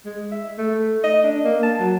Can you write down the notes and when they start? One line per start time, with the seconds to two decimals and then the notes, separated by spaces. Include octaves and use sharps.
0.05 G#3
0.32 E5
0.58 A3
1.04 D#5
1.24 D4
1.44 A#3
1.63 A5
1.80 F#3